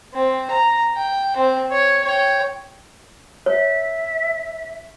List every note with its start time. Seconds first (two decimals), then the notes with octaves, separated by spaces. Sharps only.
0.14 C4
0.51 A#5
0.96 G5
1.37 C4
1.72 C#5
2.04 C#5 G5
3.46 C#5 E5